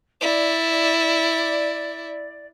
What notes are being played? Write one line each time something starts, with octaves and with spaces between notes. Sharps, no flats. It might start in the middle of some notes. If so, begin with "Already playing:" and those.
E4 D5